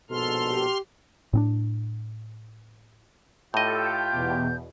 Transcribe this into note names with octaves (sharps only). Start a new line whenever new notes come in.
A#1 G#2 B2 A4 C6 F6
G4
A2 C4 D4
A2 F4 G4 A4 D#5 G6
E2 B2